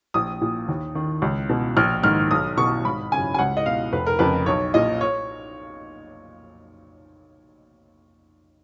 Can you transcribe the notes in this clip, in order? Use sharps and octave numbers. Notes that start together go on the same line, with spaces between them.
A#1 D#6
A#2
D#2
D#3
C#2
B2
A#1 F6
G#2 D#3 F6
B1 D#6
B2 C#6
G#1 B5
F#2 C#3 G#5
G#5
C#2 F#5
D#5
B2 F5
F1 B4
A#4
F2 C#3 B4
B1 C#5
A#2 D#5
C#5